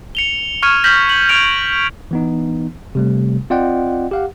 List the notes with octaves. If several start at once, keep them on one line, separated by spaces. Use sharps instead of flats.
C#7 F7 G7
C#6 F6 G#6 C#7 D#7
F6 G6 A#6 B6 F#7
F#7
F6 G6 G#6 D7 F7
E3 B3 D#4
C3 G3 A3
C4 F4 D5 D#5 F#5 G5
G4 F5 F#5